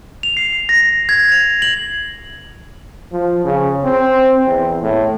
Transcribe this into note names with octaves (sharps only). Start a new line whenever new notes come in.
F7
C7
A#6
G#6
F7
F#7
F3
C#3
C4
E2
A2